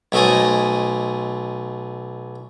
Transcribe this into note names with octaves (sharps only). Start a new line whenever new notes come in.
B1 A3 C5 D#5 G#5